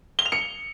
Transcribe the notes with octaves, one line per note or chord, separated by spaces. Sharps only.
G7
F7
C#7